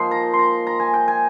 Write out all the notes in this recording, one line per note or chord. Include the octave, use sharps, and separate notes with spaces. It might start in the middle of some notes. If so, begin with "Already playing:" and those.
Already playing: F3 A#3 D#4 C6
A#5
C6
A#5
A#5
G#5
G5
G#5